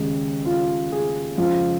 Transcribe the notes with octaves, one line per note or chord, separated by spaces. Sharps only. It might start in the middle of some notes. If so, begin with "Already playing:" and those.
Already playing: D#2 C#3 G#3
F4
G#4
F2 C#3 F3 G#3 F4